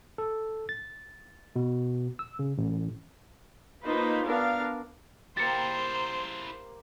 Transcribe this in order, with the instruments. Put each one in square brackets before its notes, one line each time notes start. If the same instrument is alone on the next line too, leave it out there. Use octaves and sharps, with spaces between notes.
[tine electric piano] A4
A6
B2
E6
C#3
A1
[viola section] A#3 D#4 F4 B4 C5
B3 D4 A#4 F5
[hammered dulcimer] A#3 G4 [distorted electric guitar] E4 A#4 [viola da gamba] C5 [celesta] A6 C#7